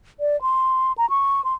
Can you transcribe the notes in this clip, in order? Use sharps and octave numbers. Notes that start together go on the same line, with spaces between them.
D5
C6
A#5
C#6
C6